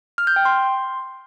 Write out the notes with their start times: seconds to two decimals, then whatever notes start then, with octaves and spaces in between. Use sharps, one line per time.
0.18 F6
0.27 G6
0.36 G5
0.45 C6